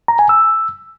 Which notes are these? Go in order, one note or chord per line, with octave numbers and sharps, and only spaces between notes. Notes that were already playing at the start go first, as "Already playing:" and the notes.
A#5
G#5
E6